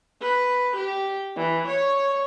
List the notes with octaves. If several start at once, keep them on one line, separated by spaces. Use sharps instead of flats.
B4
G4
E3
C#5